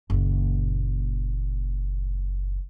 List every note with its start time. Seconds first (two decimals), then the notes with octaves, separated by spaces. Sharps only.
0.10 F#1 A#2